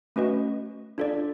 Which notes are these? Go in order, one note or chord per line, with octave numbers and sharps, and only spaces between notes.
A3 C#4 F#4 B4 D#5
D4 F4 A4 D5